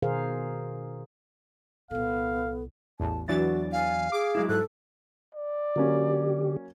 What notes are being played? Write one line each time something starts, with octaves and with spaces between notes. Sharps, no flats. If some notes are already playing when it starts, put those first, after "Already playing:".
B2 D#3 G#4 A#4 C5 F5
C2 A#2 B3 A4 F5
A1 E2 A5
E2 E3 F#3 D4 F#4 A6
F5 G#5
G#4 D6
F#3 G#3 E4
G#2 A4 F#6
D5
D3 F#3 A#3 C#4 G4